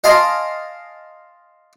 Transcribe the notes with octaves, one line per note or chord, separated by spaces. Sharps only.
D#5 F5 G#5 A5 C6 D6